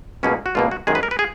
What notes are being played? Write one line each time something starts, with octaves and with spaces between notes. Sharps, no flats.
C#2 B2 A#3 C#4
F#4
C#2 B2 A#3 F4
F#4
F#2 D#3 G#3 G#4
B4
A#4
B4
G#4